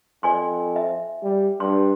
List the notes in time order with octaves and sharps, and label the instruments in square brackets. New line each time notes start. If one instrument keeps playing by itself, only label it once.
[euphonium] F2 [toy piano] D5 G#5 C6
[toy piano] D#5 E5
[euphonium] G3
[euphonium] G2 [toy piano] C6